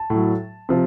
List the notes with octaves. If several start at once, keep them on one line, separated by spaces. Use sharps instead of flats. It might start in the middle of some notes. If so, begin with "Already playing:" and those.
Already playing: A5
A2 F#3
C3 F3